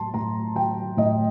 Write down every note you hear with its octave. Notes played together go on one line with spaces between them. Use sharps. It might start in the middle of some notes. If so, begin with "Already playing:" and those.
Already playing: A2 F#3 A5 C6
A2 A#5
F#3 G5
A2 D#5